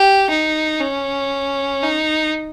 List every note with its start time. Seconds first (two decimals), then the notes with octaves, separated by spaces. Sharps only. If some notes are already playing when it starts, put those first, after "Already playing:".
Already playing: G4
0.30 D#4
0.80 C#4
1.83 D#4